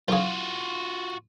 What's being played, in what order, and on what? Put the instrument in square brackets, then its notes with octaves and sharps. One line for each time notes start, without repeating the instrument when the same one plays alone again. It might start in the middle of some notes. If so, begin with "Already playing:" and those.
[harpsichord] B1 C#3 [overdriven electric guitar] F4 F#4